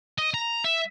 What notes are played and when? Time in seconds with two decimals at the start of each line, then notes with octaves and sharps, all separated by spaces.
0.18 D#5
0.34 A#5
0.64 E5